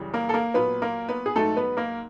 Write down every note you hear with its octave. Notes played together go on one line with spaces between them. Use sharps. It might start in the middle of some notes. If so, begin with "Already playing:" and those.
Already playing: F#2 C#3 E3 G3
A#3 A#4
A4
A#3 A#4
A#2 F#3 B3 B4
A#3 A#4
B3 B4
G#4
G#2 D#3 F#3 A3 A4
B3 B4
A#3 A#4